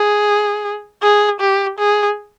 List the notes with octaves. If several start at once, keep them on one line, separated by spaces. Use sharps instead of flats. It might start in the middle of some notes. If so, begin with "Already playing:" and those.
Already playing: G#4
G#4
G4
G#4